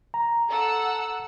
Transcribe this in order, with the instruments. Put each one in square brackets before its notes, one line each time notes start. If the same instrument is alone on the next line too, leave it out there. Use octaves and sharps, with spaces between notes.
[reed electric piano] A#5
[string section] A4 F#5 E6